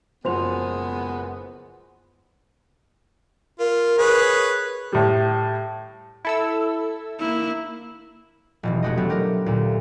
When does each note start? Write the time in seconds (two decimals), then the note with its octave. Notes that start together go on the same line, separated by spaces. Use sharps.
0.25 F#1 B2 F3 G#3 B3 C5 C6 F7
3.59 F4 A#4
3.98 G#4 B4 C#5
4.92 A2 G3
6.25 E4 A4 E6
7.19 A#3 E4
8.63 F1 B2 E3
8.83 G#3 A3 C#4 F#4 G4 D#5
8.97 F#3 A3 B3 C4 D4 G4
9.10 G4 A#4
9.46 D2 A#2